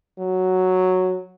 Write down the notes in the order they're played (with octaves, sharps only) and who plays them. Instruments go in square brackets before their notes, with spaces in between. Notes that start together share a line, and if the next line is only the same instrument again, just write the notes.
[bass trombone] F#3